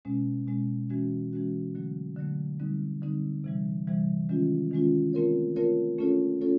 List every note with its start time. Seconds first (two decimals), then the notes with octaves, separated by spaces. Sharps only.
0.05 B2 G#3 C#4
0.47 B2 G#3 C#4
0.90 E3 G#3 C#4 F#4
1.33 E3 G#3 C#4 F#4
1.75 D3 F#3 A3
2.17 D3 F#3 A3
2.60 D3 G3 C4 D#4
3.02 D3 G3 C4 D#4
3.44 C3 E3 G3
3.87 C3 E3 G3
4.29 D#3 G#3 C#4 F4
4.71 D#3 G#3 C#4 F4
5.13 A3 C4 F4 A#4 C#5
5.56 A3 C4 F4 A#4 C#5
5.99 A3 C#4 F4 A4 C#5
6.41 A3 C#4 F4 A4 C#5